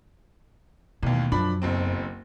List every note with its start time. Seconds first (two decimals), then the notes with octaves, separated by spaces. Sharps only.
1.03 A1 D#2 B2
1.32 F#2 F3 D4 B5
1.62 F#1 B1 C4